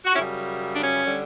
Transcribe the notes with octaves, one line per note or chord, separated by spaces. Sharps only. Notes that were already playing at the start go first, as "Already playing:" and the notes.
F#4
F#2 C#3 G3 C#4 E4
D4
C#4
D3 G3